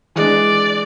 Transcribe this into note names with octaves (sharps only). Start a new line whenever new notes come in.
E3 G#3 D4 D5